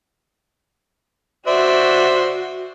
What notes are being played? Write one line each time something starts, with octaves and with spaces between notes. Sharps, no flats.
F#4 C5 D5 E5